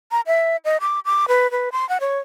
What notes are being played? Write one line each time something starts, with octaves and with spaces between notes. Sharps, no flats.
A#5
E5
D#5
D6
D6
B4
B4
C6
F#5
C#5